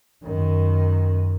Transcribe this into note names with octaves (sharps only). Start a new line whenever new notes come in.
F#2 D#3